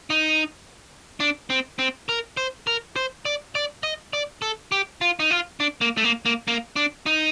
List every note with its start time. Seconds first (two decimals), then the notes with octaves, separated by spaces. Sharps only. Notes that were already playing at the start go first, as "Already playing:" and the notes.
0.10 D#4
1.20 D4
1.50 C4
1.79 C4
2.09 A#4
2.37 C5
2.67 A#4
2.96 C5
3.25 D5
3.55 D5
3.83 D#5
4.13 D5
4.42 A4
4.72 G4
5.01 F4
5.19 D#4
5.31 F4
5.60 D4
5.81 A#3
5.97 A3
6.04 A#3
6.25 A#3
6.48 A#3
6.76 D4
7.06 D#4